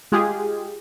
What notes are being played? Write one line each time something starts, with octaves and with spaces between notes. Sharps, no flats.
G#3 F4 G4 G#4